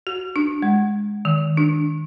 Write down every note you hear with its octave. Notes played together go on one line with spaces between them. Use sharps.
F#4
D4
G#3
D#3
D4